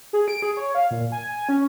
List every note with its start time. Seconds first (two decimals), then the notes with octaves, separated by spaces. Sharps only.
0.13 G#4
0.28 D7
0.42 G#4
0.57 C#5
0.75 F5
0.91 A#2
1.12 G#5
1.32 G#5
1.49 C#4